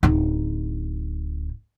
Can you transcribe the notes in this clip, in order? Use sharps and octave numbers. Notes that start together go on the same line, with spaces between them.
D1 D#4